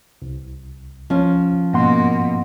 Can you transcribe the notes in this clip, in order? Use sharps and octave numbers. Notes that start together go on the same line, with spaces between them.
C2
F3 C#4
G#2 B2 A#3 F#5 C6